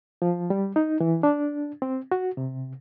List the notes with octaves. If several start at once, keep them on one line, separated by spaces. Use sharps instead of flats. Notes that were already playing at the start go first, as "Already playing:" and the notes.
F3
G3
D#4
E3
D4
C4
F#4
C3